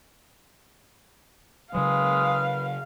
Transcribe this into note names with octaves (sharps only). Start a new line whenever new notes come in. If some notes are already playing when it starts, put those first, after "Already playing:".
C#3 F#3 G#3 B4 F5